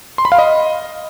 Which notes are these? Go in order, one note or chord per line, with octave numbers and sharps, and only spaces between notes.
C6
B5
F5
D#5